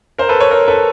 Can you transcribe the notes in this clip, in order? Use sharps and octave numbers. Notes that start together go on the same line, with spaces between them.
A#4 C5
A4 B4
B4 C#5
A#4 C5
A4 B4